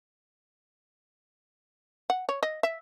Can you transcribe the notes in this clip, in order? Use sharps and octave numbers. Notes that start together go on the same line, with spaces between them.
F#5
C#5
D#5
E5